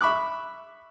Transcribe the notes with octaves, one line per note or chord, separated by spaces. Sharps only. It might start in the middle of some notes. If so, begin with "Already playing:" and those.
E5 B5 C#6 D6 F#6